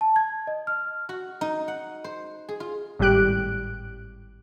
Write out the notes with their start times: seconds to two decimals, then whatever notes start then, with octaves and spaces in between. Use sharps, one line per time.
0.01 A5
0.16 G#6
0.47 D#5
0.67 F6
1.09 F#4
1.41 D#4
1.68 F#5
2.04 C5
2.49 G#4
2.60 F4
2.99 G#1 A2 G3 G4 F#6 D7